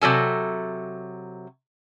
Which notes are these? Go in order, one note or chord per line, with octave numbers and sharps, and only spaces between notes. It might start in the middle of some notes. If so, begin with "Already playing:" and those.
C3 F#3 A4 G#5